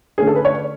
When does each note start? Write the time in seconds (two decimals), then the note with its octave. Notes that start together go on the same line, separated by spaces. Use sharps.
0.18 D3 A3 C#4 G#4
0.27 A4
0.35 B4
0.45 C#5